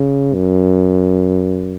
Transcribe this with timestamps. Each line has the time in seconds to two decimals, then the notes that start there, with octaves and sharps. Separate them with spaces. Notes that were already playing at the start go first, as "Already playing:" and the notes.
Already playing: C#3
0.34 F#2